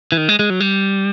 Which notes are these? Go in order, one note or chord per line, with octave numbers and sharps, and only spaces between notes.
E3
D#3
G#3
G#3
F#3
G3